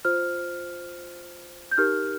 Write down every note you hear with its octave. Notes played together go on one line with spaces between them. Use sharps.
F4 C5 F6
G6
D#4 G4 A#4 F6